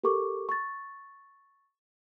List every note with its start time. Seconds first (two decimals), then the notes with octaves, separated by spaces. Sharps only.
0.04 G4 A4 A#4 C#6 D6
0.49 C#6 A6